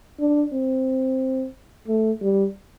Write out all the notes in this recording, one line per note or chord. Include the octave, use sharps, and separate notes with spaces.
D4
C4
A3
G3